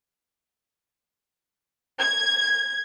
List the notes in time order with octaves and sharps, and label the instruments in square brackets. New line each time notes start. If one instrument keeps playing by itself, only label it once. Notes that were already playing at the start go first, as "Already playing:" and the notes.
[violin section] G#6